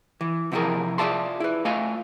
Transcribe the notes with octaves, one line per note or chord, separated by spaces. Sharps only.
E3
C3 F3 E4 F4 G#4 A#4
F4 G#4 D5 E5 A5 C6
E4 B4
A3 F4 D#5 F5 G#5